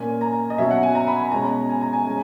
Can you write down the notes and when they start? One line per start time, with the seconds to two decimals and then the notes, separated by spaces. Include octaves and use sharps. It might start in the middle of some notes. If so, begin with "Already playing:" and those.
Already playing: A#2 A#3 C#4 G#5
0.21 A#5
0.50 D#5
0.58 B2 F#3 C#4 E5
0.71 F#5
0.83 G#5
0.95 A#5
1.08 B5
1.20 B5
1.32 B2 G#3 C#4 A#5
1.69 G#5
1.81 A#5
1.93 G#5
2.05 G#3 C#4